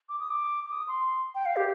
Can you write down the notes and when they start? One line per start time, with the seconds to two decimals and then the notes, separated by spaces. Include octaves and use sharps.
0.09 D6
0.20 D#6
0.30 D6
0.65 D6
0.72 D#6
0.88 C6
1.35 G5
1.46 F5
1.56 G4